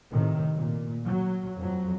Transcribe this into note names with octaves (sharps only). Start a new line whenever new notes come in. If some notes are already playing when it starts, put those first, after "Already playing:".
A2 C3 D#3
A#2
F#3
F2 F#3